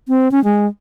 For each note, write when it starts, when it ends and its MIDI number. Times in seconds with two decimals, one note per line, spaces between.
0.08 0.31 60
0.31 0.42 61
0.44 0.66 56